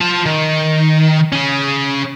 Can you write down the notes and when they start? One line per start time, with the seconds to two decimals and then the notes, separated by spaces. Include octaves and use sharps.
0.01 F4 A5
0.26 D#3
1.33 C#4 G#4